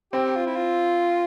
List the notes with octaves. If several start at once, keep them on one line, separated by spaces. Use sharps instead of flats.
C4 G4
F4
E4
F4